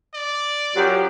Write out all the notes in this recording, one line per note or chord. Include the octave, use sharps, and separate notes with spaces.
D5
F#2 F3 F#3 G4